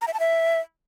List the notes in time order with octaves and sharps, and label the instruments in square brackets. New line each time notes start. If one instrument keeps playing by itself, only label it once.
[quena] A#5
E5
A5
E5